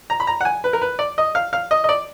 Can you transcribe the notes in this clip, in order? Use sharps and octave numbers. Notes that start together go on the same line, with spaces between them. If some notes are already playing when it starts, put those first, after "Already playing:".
A#5
B5
A#5
F#5
G#5
B4
A#4
B4
D5
D#5
F5
F5
D#5
D#5
D5